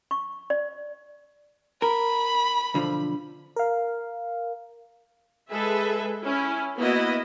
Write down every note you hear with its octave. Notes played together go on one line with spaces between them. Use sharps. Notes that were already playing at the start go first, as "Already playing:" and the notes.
C#6
D5
A#4 B5
B1 D3 F3
A#4 F5
G#3 G#4 A4 B4 E5
C#4 E4
A#3 B3 E4 F#4 D#5